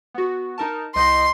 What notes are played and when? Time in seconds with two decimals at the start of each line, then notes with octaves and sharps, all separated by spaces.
0.14 B3 F#4
0.58 D#4 A#4 A5
0.95 C2 D#5 C6 G6